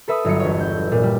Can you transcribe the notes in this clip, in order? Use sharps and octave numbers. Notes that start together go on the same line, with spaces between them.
A4 B4 E5 B5 D#6
G1 F#3 C#7
E1 C#5
G6
A#2
G3